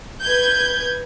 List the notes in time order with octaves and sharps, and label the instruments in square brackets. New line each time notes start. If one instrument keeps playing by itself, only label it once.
[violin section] B4 G6 G#6